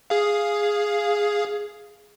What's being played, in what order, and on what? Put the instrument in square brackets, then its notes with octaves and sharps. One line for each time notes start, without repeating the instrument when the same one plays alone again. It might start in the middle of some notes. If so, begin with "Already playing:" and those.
[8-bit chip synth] G#4 F5